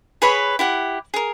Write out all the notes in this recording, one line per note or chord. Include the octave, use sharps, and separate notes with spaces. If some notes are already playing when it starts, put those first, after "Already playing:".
G#4 B4 C#5 B5
E4 G4 F#5
G#4 A#4